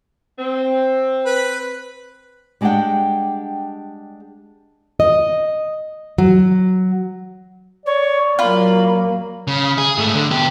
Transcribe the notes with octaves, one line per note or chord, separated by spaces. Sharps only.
C4
B4
G3 G#3 D4 G4 F#5 G5
D#5
F#3
C#5 D5
F#3 A#3 F4 B5
C#3
G#4
G#2 A3
D3
B2 G4